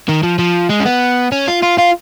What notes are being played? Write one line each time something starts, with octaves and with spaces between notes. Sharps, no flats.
D#3
F3
F3
G#3
C#4
B3
C#4
F4
F4
F4